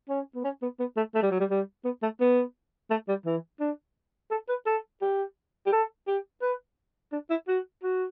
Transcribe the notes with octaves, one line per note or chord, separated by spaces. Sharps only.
C#4
B3
C#4
B3
B3
A3
A3
G3
F#3
G3
G3
B3
A3
B3
A3
G3
E3
D4
A4
B4
A4
G4
G4
A4
G4
B4
D4
E4
F#4
F#4